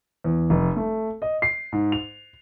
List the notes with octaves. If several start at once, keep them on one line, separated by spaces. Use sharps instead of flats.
E2
F1
A3
D#5
C7
G#2
F7